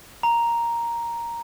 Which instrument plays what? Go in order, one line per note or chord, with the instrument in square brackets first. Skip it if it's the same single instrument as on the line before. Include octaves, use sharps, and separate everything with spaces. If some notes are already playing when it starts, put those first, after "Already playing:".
[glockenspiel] A#5